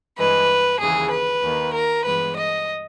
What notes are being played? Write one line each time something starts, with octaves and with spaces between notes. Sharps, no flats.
G2 E3 G#3 B4
D#2 C#3 E3 G#4
B4
D#2 D#3 A#3
A#4
G2 E3 G#3 B3 B4
D#5